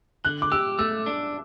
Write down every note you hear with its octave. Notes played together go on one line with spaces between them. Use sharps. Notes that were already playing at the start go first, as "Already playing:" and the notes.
D3 F#6
D6
G4 E6
A3 E6
D4